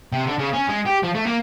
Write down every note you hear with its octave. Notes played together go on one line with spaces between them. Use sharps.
C3
D3
C#3
C#4
G#3
G4
F3
A3
A#3